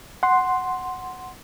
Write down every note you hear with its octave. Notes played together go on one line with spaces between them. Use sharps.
F#5 C6